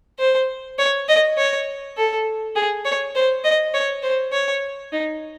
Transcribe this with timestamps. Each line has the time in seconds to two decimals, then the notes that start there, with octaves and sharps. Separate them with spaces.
0.19 C5
0.79 C#5
1.08 D#5
1.37 C#5
1.97 A4
2.56 G#4
2.85 C#5
3.15 C5
3.44 D#5
3.74 C#5
4.03 C5
4.33 C#5
4.92 D#4